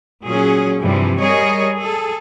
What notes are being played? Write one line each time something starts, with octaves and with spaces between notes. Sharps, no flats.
A#2 F#3 C#4 G#4
G2 C3 E3 F3 G3
G3 G#4 A#4 C#5 D#5
G#4 A4